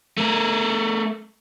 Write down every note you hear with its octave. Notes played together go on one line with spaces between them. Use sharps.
A3 A#4